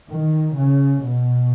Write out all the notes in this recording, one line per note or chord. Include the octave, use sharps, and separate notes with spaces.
D#3
C#3
B2